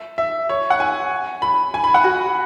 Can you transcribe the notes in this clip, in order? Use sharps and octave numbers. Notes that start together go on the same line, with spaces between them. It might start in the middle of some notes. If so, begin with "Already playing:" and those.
Already playing: E5
E5
C#5
F#5
G#5
B5
G#5
B5
F#5
F#4